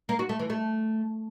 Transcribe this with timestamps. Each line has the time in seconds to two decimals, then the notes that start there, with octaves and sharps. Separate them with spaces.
0.09 A#3
0.19 F#4
0.29 A3
0.39 E3
0.50 A3